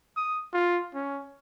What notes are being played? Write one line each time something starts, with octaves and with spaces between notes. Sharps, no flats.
D#6
F4
C#4